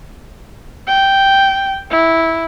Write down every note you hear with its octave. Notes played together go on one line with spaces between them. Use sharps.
G5
E4